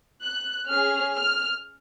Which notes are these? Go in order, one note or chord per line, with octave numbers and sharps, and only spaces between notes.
F#6
C#4 G#4 F6
F6